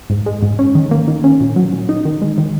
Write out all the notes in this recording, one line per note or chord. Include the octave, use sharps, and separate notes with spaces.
G#2
G#3
G#2
C#4
D#3
A#3
D#3
C#4
A#2
F#3
A#2
D#4
D#3
G#3
D#3